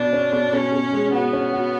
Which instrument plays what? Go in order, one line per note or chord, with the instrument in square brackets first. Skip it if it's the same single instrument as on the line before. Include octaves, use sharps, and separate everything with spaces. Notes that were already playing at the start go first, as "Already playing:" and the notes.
Already playing: [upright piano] B2 [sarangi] D4
[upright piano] C#4
B2
[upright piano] B2 [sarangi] C#4
[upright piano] B2
G#3
[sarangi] B3 [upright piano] F#4
[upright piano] C#4
F#4